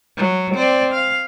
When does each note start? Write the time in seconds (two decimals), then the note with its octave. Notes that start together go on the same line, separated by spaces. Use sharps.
0.17 F#3
0.55 C4 D5
0.93 F5